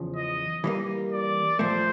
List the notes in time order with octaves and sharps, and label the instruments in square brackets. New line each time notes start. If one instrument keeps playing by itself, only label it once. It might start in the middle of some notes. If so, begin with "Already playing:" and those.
Already playing: [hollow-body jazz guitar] E2 C#3 F3
[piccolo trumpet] D#5
[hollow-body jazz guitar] E3 G3 A#3
[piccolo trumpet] D5
[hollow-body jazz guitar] A#2 F3 A3 [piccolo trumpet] C5